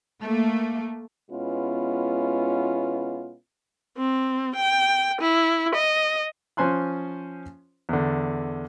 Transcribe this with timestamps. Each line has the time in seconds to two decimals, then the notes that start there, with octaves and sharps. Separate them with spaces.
0.23 A3 A#3
1.30 B2 G#3 B3 C#4 E4 F4
3.97 C4
4.56 G5
5.21 E4
5.75 D#5
6.57 F3 C#4 C5 G#5 C6 F#6
7.89 E2 D3